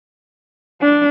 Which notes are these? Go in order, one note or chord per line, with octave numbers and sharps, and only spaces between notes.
D4